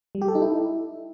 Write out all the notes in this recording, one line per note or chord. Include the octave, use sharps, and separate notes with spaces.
G3
G4
A4
D#4
E4